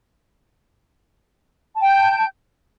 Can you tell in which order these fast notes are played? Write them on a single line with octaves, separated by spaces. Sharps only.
A5 G5 G6